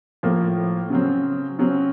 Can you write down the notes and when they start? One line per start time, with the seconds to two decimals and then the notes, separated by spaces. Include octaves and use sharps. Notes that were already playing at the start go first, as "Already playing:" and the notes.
0.23 A2 F3 A#3
0.90 C#3 F#3 C4
1.59 C#3 F#3 C4